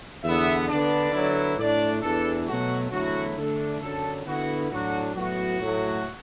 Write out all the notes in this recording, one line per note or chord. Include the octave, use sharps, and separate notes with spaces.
E2 D3 B3 E5
D3 B3 D4 D5
D3 F#3 B3 E4
A2 A3 D4 D5
E2 E3 D4 A4
B2 F#3 A3 F#4
E2 D3 F#3 A3 E4 F#4
D3 A3 D4 A4
F#2 D3 F#3 D4 A4
D3 B3 E4 F#4
A2 F#3 D4 F#4
A2 F#3 B3 E4 F#4
A2 F#3 A3